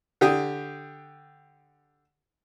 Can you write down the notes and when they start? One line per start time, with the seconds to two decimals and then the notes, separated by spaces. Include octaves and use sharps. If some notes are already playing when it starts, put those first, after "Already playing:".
0.21 D3 G4 D#6